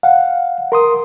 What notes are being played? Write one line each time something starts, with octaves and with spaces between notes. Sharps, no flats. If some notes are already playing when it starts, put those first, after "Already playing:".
F5 F#5
A#4 C6 D#6